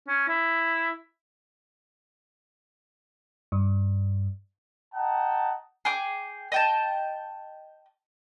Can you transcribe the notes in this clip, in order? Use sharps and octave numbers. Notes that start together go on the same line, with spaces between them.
C#4
E4
G2
D#5 F#5 G5 A5 A#5
G#4 G5 D6
D#5 G5 A5